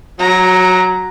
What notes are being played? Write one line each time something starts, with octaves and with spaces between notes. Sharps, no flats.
F#3 A#5